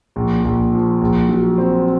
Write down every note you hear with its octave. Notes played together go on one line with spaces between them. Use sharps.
A#1
A#1
F3
A#1
F#3
C4